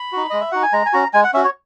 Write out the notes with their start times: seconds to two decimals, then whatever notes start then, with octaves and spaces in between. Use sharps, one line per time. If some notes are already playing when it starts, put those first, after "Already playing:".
Already playing: B5
0.13 D#4 F#4
0.30 G#3 D#5
0.41 E5
0.52 D#4 F#4 F#5
0.63 G#5
0.73 G#3 A#5
0.86 G#5
0.93 C#4 F#4 A#5
1.14 G#3 G#5
1.24 F#5
1.34 C#4 E5
1.37 F#4
1.44 C#5